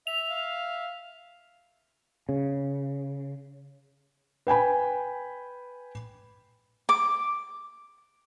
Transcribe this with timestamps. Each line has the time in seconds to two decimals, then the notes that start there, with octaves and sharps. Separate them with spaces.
0.07 E5 F7
0.28 F5
2.29 C#3
4.47 B4 G5 G#5 B5
6.89 D6